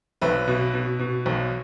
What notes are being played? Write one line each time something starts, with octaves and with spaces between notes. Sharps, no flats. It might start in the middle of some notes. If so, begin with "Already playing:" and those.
B1 B4 E5
B2
B2
B2
B1